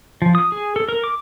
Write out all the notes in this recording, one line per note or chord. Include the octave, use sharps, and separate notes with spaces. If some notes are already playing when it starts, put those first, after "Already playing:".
F3
D#6
G#4
A4
A#4
D6